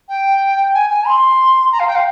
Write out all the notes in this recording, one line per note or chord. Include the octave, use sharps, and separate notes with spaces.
G5
G#5
G#5
C6
A#5
F5
G5
F5